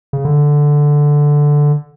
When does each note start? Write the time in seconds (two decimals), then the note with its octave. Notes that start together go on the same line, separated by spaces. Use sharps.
0.13 C#3
0.25 D3